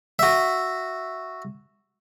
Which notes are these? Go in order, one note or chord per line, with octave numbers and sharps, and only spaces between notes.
F#4 E5